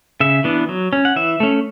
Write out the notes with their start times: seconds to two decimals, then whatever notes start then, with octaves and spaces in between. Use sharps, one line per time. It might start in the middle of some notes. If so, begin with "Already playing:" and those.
0.20 C#3 E5
0.44 E3 B3 D4
0.69 F#3
0.93 C#4
1.05 F#5
1.16 E3 E5
1.40 A3 C#4